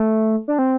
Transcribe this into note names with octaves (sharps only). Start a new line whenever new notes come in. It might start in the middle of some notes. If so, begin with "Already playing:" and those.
Already playing: A3
D4
C4